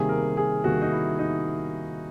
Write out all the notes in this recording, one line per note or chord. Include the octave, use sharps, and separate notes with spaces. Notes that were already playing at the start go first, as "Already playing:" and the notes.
Already playing: C3 D#3 G3 A#3 G#4
A#4
G#4
C3 D#3 G3 A#3 F#4
D#4
E4
D#4